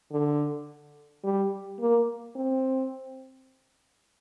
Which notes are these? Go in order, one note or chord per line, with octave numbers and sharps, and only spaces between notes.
D3
G3
A#3
C4